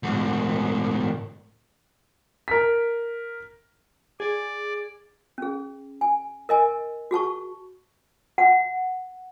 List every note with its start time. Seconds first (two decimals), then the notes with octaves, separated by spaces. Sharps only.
0.03 D2 G#2
2.48 A#4 B6
4.20 G#4 D5
5.38 C#4 G#4
6.01 G#5
6.49 A#4 D#5 G#5
7.11 F#4 G#4 A5 C#6
8.38 F#5